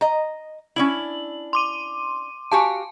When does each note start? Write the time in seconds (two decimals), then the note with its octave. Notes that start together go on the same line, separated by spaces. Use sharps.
0.01 D#5 A#5
0.76 C#4 D4 E4 F#7
1.53 C6 D6 D#7
2.52 F#4 G4 F5 G#5 A5